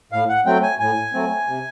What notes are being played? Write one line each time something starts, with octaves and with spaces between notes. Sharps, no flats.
A2 F5
F#5
F#3 A3 C4 G5
G#5
A2 G#5
F#3 A3 C4
C3